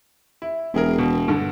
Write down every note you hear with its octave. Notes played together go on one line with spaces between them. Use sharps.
E4
E1 E4 G#4 A#4
B2
G2 D3